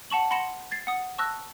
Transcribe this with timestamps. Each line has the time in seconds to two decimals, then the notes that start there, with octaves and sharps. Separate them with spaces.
0.10 F#5 A5 C#6 F#7
0.31 F#5 B5 C6 A#6 C#7 E7
0.71 G#6 A6 C7
0.87 F#5 D#6
1.18 A5 C#6 D#6 E6 F#6 A#6